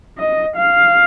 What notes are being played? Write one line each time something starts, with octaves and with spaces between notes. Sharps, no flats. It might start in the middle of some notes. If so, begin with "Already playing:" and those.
D#5
F5